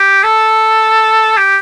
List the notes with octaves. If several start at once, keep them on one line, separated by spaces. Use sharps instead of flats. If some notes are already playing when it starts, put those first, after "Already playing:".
Already playing: G4
A4
G4